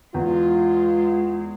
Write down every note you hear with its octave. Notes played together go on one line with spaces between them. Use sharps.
E2 G#3 F4